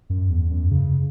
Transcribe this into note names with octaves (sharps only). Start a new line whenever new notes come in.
F#2
E2
F#2
C#3